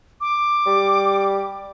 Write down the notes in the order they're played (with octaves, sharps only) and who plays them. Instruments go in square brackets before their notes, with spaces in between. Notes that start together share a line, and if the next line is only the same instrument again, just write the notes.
[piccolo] D6
[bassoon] G3